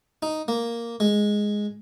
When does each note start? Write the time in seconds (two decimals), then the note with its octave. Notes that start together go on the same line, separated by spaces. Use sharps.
0.23 D#4
0.48 A#3
1.00 G#3